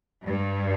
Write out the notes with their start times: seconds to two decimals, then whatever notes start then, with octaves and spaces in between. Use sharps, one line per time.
0.23 G2